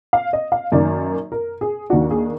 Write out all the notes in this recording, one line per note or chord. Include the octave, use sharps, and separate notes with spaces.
F5
D#5
F5
F#2 D#3 A#3 D5
A#4
G#4
D#2 D#3 A#3 D4 F#4
G#4